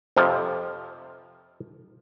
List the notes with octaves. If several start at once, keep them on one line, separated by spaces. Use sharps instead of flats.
F2 C3 F3